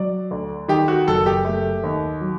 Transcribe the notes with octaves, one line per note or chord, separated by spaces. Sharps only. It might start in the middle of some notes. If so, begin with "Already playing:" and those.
Already playing: F#3 D5
D2
D#3 G4
F#4
F#1 A4
G4
A3
D#2
F#3